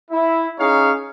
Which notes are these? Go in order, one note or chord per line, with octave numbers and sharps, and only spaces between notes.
E4
C#4 D#4 G#4 C#5 F5